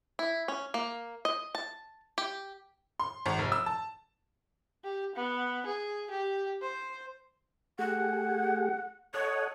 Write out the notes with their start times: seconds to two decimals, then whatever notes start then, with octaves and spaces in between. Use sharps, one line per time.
0.19 E4
0.48 C#4
0.74 A#3
1.25 D#5
1.55 A5
2.18 G4
3.00 C6
3.26 G#1
3.39 F1
3.52 E6
3.66 A5
4.84 G4
5.15 B3
5.66 G#4
6.10 G4
6.61 C5
7.79 A3 G4 G#4 F#5
9.14 A4 C#5 D#5 F#5